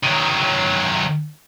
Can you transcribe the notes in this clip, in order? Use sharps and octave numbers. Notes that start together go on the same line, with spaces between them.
D#3 F#3